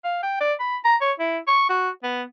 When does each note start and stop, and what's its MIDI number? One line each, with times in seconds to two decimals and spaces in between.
0.04 0.19 77
0.23 0.39 79
0.41 0.53 74
0.60 0.77 83
0.85 0.96 82
1.01 1.12 73
1.20 1.38 64
1.48 1.65 85
1.70 1.90 66
2.03 2.23 59